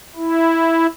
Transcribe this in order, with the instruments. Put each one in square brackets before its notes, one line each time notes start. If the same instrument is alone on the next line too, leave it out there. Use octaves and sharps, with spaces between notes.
[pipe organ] E4